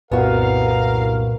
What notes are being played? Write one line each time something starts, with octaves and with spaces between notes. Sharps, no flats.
C2 F#2 A#2 B3 F#4 A#4 F5